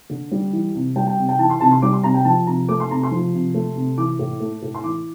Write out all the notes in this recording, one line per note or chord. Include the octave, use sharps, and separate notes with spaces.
D3
G3
E3
C3
G3 G5
G5
C3
G5
E3 A5
C6
C3 A5
C6
G3 D6
C6
C3 A#5
G5
F3 A5
C3 A#5
A3 D6
C6
C3 A#5
C6
F3
C3
A3
C3
E3 D6
A2
A3
A2
C6
E3 D6